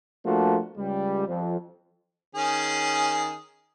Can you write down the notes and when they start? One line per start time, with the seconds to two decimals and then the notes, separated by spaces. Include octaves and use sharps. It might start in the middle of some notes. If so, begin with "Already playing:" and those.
0.25 F3 A3 A#3 D4 F4 F#4
0.77 C#2 G3
1.27 F2
2.35 D#3 C#4 G#4